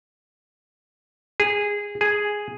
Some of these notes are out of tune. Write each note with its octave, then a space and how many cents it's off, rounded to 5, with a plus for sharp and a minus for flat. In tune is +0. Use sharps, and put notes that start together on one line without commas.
G#4 -15
G#4 +0